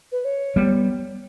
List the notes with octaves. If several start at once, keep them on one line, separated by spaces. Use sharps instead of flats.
B4
C#5
G3 B3